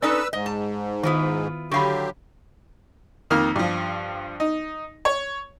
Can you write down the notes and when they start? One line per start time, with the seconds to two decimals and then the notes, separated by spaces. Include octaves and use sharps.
0.02 C#4 D#4 A4 B4 D5 E6
0.33 G#2 D#5
0.46 A5
1.03 D#3 B3 E4 F4
1.72 D3 F#3 G4 F5 B5 C#6
3.30 F2 D#3 A#3 F6
3.56 G2 F3
4.40 D#4
5.05 C#5